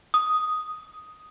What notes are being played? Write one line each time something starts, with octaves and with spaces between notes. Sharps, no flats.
D#6